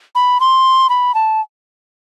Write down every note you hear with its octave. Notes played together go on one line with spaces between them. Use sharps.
B5
C6
B5
A5